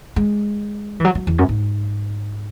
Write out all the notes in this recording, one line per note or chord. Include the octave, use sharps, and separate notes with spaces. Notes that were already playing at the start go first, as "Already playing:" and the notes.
G#3
E3
F#3
F#3
E2
F#2
G#2